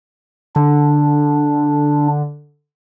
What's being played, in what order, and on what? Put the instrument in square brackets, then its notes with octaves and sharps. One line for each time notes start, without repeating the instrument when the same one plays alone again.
[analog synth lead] D3 [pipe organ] D4